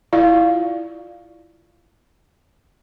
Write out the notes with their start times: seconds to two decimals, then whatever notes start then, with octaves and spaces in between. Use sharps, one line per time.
0.13 E4 F4 D5 F5